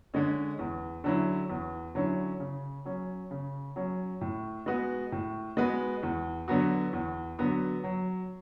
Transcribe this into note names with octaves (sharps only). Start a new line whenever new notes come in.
D3 G#3 C#4
E2
D3 F#3 C#4 E4
E2
D3 F#3 C#4 E4
C#3
F#3 C#4
C#3
F#3 C#4
A2
G#3 B3 F#4 B4
A2
G#3 B3 F#4 B4
E2
D3 F#3 B3 F#4
E2
D3 F#3 B3 F#4
F#3